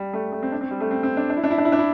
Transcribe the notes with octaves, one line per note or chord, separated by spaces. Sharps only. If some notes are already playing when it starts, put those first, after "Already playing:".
Already playing: G3
A3
A3
C4
D4
C4
G3
A3
C4
C4
D4
D4
E4
D4
E4
D4
E4
D4
E4